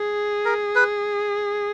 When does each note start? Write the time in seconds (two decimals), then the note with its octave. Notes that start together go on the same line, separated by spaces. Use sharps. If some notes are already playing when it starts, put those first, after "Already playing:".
Already playing: G#4
0.45 A#4
0.75 B4